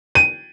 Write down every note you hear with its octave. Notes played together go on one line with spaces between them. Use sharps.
D#7